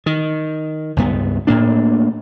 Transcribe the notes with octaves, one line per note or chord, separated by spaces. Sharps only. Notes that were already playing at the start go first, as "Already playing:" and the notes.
D#3
C#2 G2 B3
A2 A#3 D4